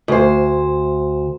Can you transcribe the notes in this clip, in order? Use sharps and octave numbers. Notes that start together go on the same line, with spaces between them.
D2 C5